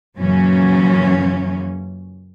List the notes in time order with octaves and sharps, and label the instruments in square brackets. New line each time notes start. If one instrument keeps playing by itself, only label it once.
[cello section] F#2 A#2 C#3 E3 F#3 C#4